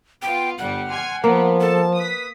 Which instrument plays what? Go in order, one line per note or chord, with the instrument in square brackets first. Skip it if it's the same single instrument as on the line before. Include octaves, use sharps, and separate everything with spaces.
[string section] B3 F4 [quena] G5
[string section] G1 G3 [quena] F#5
[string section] G#5 C6 F6
[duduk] F3 [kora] A#3 [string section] B3
[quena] A4 [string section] A5
[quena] B4 [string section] D#6 B6